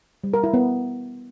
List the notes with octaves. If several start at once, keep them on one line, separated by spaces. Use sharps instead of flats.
G3
A#4
E4
B3